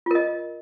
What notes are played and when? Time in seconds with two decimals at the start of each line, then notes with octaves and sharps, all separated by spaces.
0.06 F4
0.11 A#4
0.15 D#5